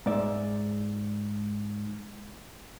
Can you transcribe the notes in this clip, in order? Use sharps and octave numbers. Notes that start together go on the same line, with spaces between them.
G#2 D5 E5